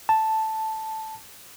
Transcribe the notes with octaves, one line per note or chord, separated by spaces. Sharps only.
A5